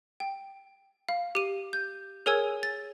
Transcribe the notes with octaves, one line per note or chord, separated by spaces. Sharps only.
G5
F5
G4 D#7
G6
G#4 A#4 C#5 G#5 E6 G#6
A6